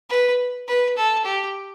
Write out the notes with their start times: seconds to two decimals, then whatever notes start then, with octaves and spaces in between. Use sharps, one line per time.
0.10 B4
0.68 B4
0.97 A4
1.25 G4